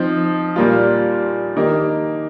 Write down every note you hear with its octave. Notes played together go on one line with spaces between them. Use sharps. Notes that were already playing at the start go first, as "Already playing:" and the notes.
Already playing: F3 C4 D#4
A#2 G3 A#3 F4
D#3 A#3 D#4 G4